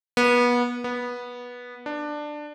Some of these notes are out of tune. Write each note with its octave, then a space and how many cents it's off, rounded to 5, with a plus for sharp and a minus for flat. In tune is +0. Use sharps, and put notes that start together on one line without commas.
B3 -25
B3 -15
D4 +15